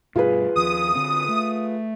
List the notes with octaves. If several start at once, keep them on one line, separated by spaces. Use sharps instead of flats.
G2 B2 G3 F4 G#4 B4
D#2 F3 D#6
D3 C4
A3